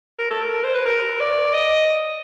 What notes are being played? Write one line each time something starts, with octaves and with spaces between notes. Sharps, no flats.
A#4
A4
A#4
C5
B4
A#4
D5
D#5